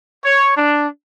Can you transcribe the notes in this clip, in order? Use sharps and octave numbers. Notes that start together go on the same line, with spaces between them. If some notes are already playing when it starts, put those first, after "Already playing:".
C#5
D4